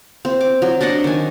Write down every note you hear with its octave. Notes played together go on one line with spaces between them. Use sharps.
C4
D6
F#3
D4 D5 D#5 F#5
D#3 G#5